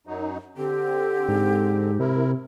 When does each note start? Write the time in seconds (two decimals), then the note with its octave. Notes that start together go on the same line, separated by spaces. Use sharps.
0.07 F#2 F#3 D#4
0.57 D3 C4 G4
1.28 G#2
1.99 C3 E4 A#4